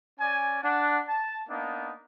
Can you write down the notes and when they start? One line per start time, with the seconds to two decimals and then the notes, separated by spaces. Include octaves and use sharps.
0.20 C#4 D5 G#5
0.62 D4 F#5
1.08 A5
1.49 A#3 B3 D4 D#4